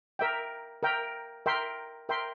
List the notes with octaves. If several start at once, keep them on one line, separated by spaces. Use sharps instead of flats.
A#4 E5 G5
A#4 E5 G5
A#4 E5 G5 C6
A#4 E5 G5 C6